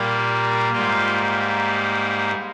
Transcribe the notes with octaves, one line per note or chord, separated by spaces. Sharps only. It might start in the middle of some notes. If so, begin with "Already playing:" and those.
Already playing: A#2 G3 A#3
G#2 G3 A#3 F4